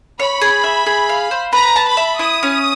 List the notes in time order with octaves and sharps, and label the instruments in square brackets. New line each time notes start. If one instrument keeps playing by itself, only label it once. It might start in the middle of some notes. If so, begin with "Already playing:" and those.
[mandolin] C#5 [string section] B5
[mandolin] G#4
E5
G#4
F5
C5
[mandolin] B4 [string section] A#5
[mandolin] A5
[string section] B5
[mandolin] E5
[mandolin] E4 [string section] D#6
[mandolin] C#4